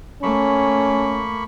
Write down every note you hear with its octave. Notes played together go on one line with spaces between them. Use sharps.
A3 A#3 C#4 B5 C#6